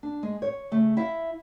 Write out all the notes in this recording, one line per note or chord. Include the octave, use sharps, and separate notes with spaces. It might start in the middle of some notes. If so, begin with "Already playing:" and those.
D4
G#3
C#5
C#3 A3
E4 E5 F5